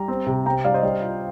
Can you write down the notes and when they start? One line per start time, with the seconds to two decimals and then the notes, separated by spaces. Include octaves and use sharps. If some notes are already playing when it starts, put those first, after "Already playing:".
Already playing: G3 A#5
0.08 C4
0.27 C3
0.46 C4 G5 A#5
0.64 G3 D5 F5
0.74 C5 D#5
0.82 G3 D5
1.02 F4